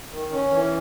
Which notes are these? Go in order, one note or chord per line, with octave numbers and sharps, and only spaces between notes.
D#3
C#4
E3